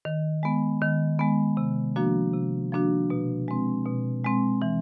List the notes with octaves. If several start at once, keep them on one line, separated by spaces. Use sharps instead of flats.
D#3
G#3 B3
D#3
G#3 B3
C3
F3 A#3 D4 F#4
C3
F3 A#3 D4 F#4
B2
G#3 C4
B2
G#3 C4
E3